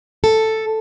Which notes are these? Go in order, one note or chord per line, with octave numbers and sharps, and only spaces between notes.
A4